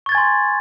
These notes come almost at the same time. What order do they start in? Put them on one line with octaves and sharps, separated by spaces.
C#6 A6 G#6 G#5 C6